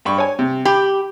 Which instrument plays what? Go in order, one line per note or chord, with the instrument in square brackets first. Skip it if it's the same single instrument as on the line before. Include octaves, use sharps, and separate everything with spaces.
[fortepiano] G2 B5 C#6
C#5 G#5
C3
[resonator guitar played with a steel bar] G4 [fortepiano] B5